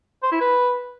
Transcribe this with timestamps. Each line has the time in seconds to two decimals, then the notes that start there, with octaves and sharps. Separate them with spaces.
0.23 C5
0.32 E4
0.40 B4